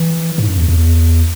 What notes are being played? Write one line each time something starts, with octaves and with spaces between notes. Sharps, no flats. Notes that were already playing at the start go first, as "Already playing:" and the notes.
Already playing: E3
G#2
F#2
E2
E2